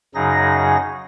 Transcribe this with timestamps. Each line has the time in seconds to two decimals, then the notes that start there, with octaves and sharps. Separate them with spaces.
0.15 F#2 C#3 F#3 D#4 G#4 A#6